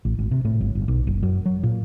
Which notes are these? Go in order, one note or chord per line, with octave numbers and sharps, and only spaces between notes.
A1
G#1
C3
A2
G1
G1
B1
F#1
F#2
F#3
A#2